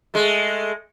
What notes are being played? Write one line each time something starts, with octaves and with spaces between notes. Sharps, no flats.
G#3 A3